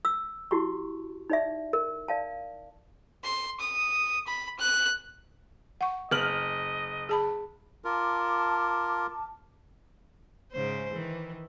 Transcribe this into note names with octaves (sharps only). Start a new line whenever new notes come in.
E6
E4 F#4 G4 A5 C#6
D#4 D5 E5
A#4
D5 F5 A5
C6
D#6
B5
F#6
F#5 C#6
F#1 D#5 F6 F#7
G#4 A5 B5
F4 A#4 A5 D6
G#2 C#3 C5
D#3 E3